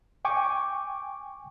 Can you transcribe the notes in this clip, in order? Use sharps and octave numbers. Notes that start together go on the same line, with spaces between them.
G5 G#5 C#6 D6